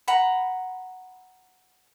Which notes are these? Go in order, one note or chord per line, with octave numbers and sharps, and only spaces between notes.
F#5 A#5 B5